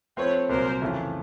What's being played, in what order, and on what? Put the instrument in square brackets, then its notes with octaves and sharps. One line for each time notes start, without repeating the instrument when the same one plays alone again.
[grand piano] F3 A3 C4 [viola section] B4 C#5
[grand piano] C2 A#2 F#3 [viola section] A#4 C5
[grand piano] F2 C#3 E3 A3